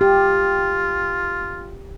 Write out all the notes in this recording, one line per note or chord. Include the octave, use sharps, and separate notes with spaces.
F4 G4